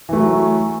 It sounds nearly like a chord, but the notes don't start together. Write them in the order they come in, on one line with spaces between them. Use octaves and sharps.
E3 A3 F#3